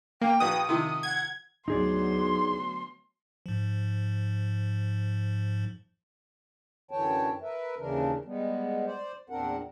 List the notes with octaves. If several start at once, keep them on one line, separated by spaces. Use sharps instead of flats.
A#3 G5
A#1 F#4 B4 D#6
C3 D#3 F3
F#5 G#6
D2 F#3 B3 D#4 G#4 D5 C6
G#2 F3
F#2 D3 E3 C#5 G5 A5
A#4 B4 E5
D#2 C#3 E3 D4 A#4
G3 G#3 B3
C5 D5
E2 A#2 C4 D4 A#4 F#5